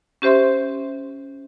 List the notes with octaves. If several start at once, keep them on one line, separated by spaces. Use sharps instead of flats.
C#4 G4 C5 E5 C6